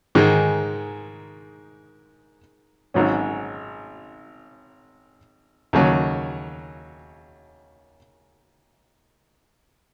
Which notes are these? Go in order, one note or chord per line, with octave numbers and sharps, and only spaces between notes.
G#2 D#3 G#3
G#1 G#2 F#3 C#4
D#2 C#3 F#3